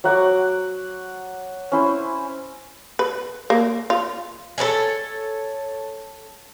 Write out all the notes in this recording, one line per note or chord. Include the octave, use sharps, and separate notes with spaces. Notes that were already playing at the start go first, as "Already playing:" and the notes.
F#3 F#5 C#6 D6
C#4 E4 C5
B4
A#3
F4
A4 B4 C#5 G#5